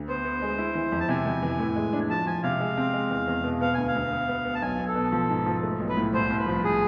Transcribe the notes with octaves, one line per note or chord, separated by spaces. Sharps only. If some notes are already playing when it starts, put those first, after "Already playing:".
Already playing: D2
B3 C5
B3
G#3
E4
E3
F2
A5
C3 G#5
F2
E3
A2
G#3
D4
F3 A5
F3 G#5
C3 F5
G#3
C4
G#3
E2
E2
B2
B3 F5
D2 G#5
F5
D2
B3
B3
B3
A5
B1 G#5
B1
A4
B2
F3
G#2
F3
A3
B1
B4
A2
C2 C5
C2
B4
F3
G#4